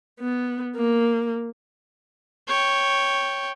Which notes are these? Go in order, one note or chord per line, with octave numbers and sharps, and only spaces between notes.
B3
A#3
C#5 G5